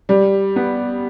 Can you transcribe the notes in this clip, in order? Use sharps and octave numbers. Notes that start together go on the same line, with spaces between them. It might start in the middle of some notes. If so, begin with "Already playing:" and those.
G3
B3